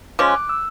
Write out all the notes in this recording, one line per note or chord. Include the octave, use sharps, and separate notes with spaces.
F3 G#3 C#4 D6
F#6
E6